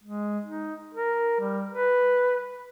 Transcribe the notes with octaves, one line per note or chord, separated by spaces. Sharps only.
G#3
D#4
A#4
G3
B4